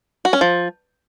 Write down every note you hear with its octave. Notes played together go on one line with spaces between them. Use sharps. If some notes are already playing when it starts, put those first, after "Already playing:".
F#4
C#4
F3